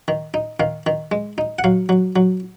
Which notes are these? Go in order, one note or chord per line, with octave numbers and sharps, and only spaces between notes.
D#3
D#4
D#3 F5
D#3
G#3
D#4
F#5
F#3 F5
F#3
F#3